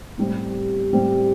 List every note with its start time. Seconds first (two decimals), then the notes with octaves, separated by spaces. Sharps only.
0.18 A2 G3 C4
0.92 A2 G3 C4